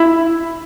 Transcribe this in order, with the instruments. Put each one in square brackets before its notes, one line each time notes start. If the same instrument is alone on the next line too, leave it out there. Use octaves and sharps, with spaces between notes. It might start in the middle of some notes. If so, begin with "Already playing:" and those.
Already playing: [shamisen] E4